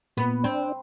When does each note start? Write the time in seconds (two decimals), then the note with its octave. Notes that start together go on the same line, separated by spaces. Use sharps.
0.17 A#2 B3
0.44 C4 D4